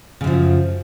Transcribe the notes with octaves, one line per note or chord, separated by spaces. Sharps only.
F#2 C#3 F3